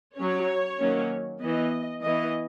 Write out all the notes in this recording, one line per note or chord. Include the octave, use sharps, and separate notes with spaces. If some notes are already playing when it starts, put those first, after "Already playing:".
F#3 C#4 C#5
D#3 F#3 A#3 C#4
E3 B3 D#5
E3 B3 D#5